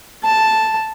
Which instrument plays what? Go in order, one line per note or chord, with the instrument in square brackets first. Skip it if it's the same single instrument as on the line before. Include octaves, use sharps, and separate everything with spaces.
[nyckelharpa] A5